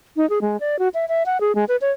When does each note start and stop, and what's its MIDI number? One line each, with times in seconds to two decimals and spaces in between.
0.17 0.28 63
0.30 0.41 68
0.41 0.59 56
0.60 0.79 74
0.79 0.88 66
0.94 1.05 76
1.09 1.23 76
1.26 1.40 78
1.41 1.55 68
1.55 1.65 56
1.68 1.76 71
1.81 1.91 73